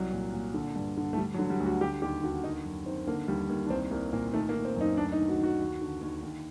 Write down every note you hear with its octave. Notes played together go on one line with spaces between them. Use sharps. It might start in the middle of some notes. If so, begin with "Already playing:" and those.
Already playing: C2 F#3
A#2
A#2
D3
G2
D3
A3
D3 G3
F#3
D3
G3
D2
F#4
D3 G4
D#2 G4
D3 F#4
D#3 D#4
F#2
D#3 C4
D3 A#3
D#2 G3
D#2 A#3
D4
C2 C4
C2 A#3
A#2 A#3
D#3 A3
A#3
D#3
C4
F#2 D#4
D2 D4
D#4
D#3
F#4
D#3
F#4
D#2
D3
D#2
D#2